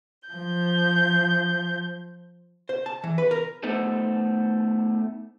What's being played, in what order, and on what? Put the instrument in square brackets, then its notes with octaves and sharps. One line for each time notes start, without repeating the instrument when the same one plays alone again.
[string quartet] F3 G6
[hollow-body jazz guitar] C5
A5
E3
B4
A#4
[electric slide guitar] A3 B3 D#4 A4 C5